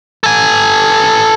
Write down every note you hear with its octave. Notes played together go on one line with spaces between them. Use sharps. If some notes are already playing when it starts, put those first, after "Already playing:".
A4 G#5